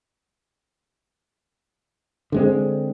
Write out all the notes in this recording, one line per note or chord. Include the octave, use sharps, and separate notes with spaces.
D3 G#3 C4